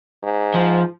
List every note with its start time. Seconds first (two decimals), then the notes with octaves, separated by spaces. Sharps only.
0.23 G#2
0.54 F3